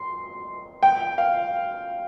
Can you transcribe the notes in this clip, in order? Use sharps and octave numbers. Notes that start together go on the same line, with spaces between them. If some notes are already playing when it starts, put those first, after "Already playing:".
Already playing: C6
G5
F5